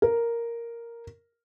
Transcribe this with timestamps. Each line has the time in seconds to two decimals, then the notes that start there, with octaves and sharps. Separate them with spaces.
0.02 A#4